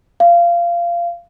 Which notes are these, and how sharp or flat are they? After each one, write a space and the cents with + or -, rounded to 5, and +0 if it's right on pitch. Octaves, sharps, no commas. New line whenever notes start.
F5 -20